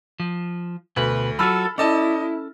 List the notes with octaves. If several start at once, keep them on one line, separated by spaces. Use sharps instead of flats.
F3
D2 B2 B4
F#3 F4 F#4 A4 B5 E6 F6
C#4 E4 A4 D5 D#5 A5